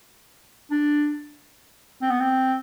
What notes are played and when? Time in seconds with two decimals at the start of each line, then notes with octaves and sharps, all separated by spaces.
0.71 D4
2.02 C4
2.11 B3
2.20 C4